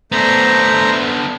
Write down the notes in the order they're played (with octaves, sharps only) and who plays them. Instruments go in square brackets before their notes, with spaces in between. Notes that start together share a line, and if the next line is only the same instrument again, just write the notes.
[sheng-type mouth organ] A3 C5 A#5 [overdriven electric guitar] B3 D4